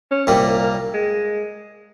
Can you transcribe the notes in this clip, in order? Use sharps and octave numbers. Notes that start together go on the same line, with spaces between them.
C#4
C2 A#2 G3 A#3
G#3